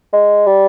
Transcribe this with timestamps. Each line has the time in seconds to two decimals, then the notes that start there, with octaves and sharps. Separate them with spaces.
0.13 G#3
0.47 G3